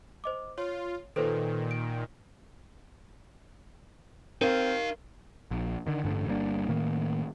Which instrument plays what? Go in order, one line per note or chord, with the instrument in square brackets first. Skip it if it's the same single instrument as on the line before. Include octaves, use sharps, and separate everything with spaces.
[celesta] C5 D#5 D6
[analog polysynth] F4 [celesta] C#5
[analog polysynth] A#2 D#3 [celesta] A4 B4 C5
[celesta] D7
[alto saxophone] C4 [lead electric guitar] D#4 F5 [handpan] A#4
[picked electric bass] A#1
D3 D#3
A1 G2 D3 A3
G1 G3 A#3 D4
A2 D#3 A#3